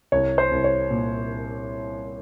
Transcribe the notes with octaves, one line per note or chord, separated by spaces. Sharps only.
C2 C#5
C5
C2
C#5
A#2